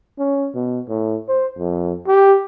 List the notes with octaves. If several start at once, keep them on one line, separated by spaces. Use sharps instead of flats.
C#4
B2
A2
C5
F2
G4